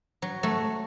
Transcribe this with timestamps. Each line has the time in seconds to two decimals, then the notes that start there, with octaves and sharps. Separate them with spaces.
0.22 F#3
0.43 F#3 A3